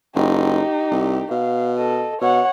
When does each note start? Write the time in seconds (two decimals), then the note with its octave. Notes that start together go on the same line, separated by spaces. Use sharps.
0.15 F#1 D#4 G4
0.91 C2
1.31 B2 F5
1.77 A4 D#5
2.21 B2 C#5 F#5